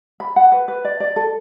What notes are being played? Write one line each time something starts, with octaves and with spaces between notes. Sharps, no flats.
B5
F#5
B4
B4
D5
D5
A4